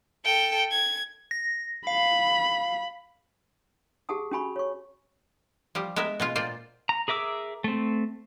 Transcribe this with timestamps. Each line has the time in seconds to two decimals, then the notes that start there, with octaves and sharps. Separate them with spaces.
0.25 A4 G5
0.71 G#6
1.31 A#6
1.87 F5 B5
4.09 G4 G#4 F#5 A5 D#6
4.31 C#4 F#4 G#5 B5 C#6
4.56 C#5 C#6
5.75 F3 G3 G4
5.96 G#3 B3 A#4 E5
6.20 B2 G#3 F4
6.35 A#2 F4 C5 D5
6.89 A#5
7.08 G#4 A#4 E5 D6 E6
7.64 A3 C4